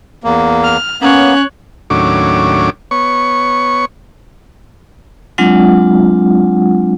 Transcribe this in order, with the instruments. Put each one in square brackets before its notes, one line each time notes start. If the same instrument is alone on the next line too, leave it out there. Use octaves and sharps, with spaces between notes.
[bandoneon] E2 A#3
[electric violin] F6
[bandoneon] A#3 B3 [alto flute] C#4 [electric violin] C#5 F#6
[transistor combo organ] D#2 A2 F#3 C#4 D4 D6
B3 C#5 C#6
[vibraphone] F#3 G#3 C4 D4 F4 F#5